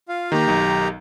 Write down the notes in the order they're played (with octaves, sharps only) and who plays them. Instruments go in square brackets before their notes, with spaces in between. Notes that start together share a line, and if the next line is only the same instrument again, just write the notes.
[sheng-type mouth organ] F4 F5
[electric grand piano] D#3 A#3 [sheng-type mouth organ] G4 A#5
[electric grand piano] B1 D#3